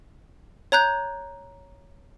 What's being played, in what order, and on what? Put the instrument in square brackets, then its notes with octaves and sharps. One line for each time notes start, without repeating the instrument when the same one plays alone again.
[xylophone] C#5 A#5 F#6 G6